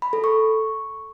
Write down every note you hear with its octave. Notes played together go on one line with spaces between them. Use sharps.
B5
A4
C#6